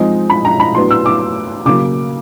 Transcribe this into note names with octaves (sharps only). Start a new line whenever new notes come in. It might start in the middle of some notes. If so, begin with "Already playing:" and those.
Already playing: F3 G#3 C4 D#4
B5
A#5
B5
A2 F#3 B3 D4 C6
E6
D6
C#3 F#3 A#3 D6